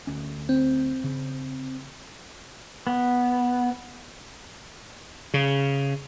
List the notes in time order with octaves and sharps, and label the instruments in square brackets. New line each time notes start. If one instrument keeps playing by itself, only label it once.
[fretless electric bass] D2 C#4
[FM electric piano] C4
[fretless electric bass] C#3
[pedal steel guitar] B3
[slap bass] C#3